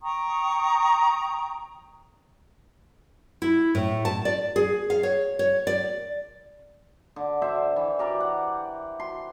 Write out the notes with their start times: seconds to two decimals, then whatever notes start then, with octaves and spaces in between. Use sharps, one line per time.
0.02 G5 A#5 C#6 D#6
3.42 E4
3.75 A2
4.05 A5
4.25 D5
4.56 G#4
4.90 F5
5.03 C#5
5.39 C#5
5.67 D5
7.16 D3
7.42 D3 C5 E5
7.76 E3
7.99 G4 A#4 D5
8.20 F#5
9.00 C6